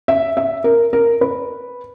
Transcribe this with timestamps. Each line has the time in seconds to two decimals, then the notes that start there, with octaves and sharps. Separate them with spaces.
0.08 E5
0.37 E5
0.64 A#4
0.93 A#4
1.21 B4